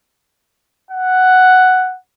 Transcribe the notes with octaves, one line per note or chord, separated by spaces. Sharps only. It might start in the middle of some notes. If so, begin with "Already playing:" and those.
F#5